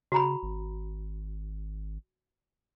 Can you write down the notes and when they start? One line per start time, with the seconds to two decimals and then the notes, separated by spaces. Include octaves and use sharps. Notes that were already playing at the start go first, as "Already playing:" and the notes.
0.12 C#3 F#4 A#5 B5
0.43 G#1